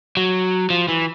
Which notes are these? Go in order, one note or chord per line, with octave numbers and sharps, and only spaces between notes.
F#3
F3
E3